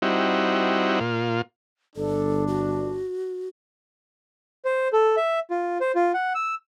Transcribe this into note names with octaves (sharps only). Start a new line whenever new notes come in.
G3 C4 D#4 E4 F#4
A#2 F4
G1 D4 A4
F#4
C5
A4
E5
F4
C5
F4
F#5
E6